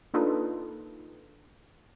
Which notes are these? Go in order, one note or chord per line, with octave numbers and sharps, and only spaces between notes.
A#3 D4 D#4 F4 A4 B4